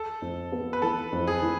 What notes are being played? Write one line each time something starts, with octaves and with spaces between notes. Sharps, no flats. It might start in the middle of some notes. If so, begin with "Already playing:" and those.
Already playing: A4
F2
B3
B4
E3 A4
F2
G#4
E3